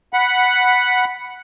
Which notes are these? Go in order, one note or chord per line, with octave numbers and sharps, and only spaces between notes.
F#5 B5